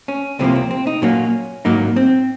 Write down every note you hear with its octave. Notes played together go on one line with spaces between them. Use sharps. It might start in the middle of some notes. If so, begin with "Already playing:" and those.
C#4
C2 C3 F3 A#3 C4
C4
C4
D#4
A#2 F#3 A#3 C#4
G#2 F#3 A#3 D#4
C4